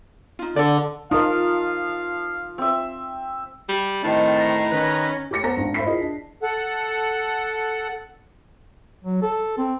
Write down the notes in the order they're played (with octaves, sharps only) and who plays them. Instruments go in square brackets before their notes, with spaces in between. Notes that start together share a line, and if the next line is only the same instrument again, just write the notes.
[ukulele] D#4 F4
[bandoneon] D3 [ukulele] A4 D5
[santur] F3 [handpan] D#4 A#4 [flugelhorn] F5
[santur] C4 E5
[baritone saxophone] G3
[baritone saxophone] A2 [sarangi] D#3 [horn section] C4 D#4 [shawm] A5
[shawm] A#5
[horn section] D#3 B4 [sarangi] C#4
[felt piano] G4 C#5 D6 A#6 C#7
B3 A4 C5 F#5 A#5 A#6
G#1 D4
C5 E5 B5 B6 C7
E4 F4 G#4 A#4 D#5
D4
[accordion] A4 F#5
[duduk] F#3
A4
C4